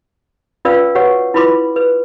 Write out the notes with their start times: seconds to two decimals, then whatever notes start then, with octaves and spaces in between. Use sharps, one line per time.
0.65 C#4 F4 B4 D5 F5 E6
0.95 F#4 B4 C#5 F#5 C#6
1.34 E4 F4 B4 B5 C6 D6
1.76 B4